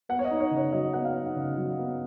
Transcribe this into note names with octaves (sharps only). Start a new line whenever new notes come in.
B3 F#5
C#5
D#5
D#4
C#5
C#3
C#5
F#3 D#5
B3 F#5
F5
D#4
C#3
F#3
B3